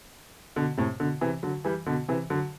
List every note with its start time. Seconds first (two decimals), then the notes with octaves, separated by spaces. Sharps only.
0.56 B2 D3
0.77 A2 C3
0.99 B2 D3
1.21 C3 E3
1.43 D3 F#3
1.65 E3 G3
1.86 B2 D3
2.08 C3 E3
2.30 D3 F#3